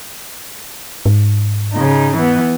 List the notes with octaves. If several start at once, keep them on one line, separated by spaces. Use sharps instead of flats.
G#2
C#3 D#4
E3 B3